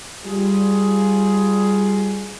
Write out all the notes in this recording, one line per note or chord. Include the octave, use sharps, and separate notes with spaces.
G3 F4 G#4